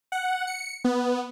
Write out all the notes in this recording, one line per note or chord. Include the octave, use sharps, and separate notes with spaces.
F#5
C#7
B3